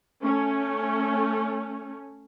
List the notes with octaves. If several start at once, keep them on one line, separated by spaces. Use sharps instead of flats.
A3 C#4